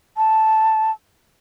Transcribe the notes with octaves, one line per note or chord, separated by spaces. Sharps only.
A5